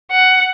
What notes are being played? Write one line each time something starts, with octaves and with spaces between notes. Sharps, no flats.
F#5